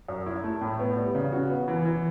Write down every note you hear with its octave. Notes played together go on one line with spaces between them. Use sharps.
F#2
E4
A3
A2
B3
G3
C#3
F#4
B3
E3
E3